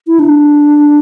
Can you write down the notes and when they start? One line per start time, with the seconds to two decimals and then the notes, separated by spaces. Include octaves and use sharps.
0.07 E4
0.19 D4